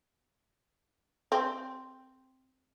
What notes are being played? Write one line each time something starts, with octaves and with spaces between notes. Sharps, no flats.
C4